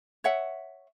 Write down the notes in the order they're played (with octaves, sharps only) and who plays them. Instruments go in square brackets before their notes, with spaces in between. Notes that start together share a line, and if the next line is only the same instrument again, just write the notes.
[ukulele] C#5 E5 F#5